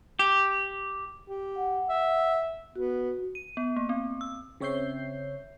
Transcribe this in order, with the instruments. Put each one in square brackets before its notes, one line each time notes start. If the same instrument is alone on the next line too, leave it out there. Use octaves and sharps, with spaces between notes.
[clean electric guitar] G4
[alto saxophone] G4
[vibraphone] F#5
[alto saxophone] E5
[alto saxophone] B3 [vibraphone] F#4
[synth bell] D#7
B3
A#3
C4
E6
[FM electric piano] C#3 C4 C#5 E5 G6 C7